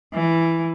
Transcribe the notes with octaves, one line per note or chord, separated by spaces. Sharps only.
E3